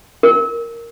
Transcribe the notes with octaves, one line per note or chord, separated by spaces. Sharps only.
A#4